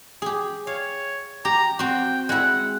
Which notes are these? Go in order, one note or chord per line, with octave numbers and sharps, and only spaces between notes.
G4 G#4
C#5 F5
G4 A#5
C4 F#4 G5
G#3 E4 F#5